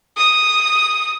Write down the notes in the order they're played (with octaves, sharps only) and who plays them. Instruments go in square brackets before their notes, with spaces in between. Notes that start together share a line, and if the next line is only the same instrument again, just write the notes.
[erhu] D#6